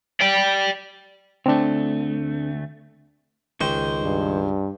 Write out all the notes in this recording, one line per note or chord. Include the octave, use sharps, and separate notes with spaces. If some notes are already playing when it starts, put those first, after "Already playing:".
D5 G5
D2 A3 C4 D4
C#2 D#3 G#3 C5 G5 C#6
G2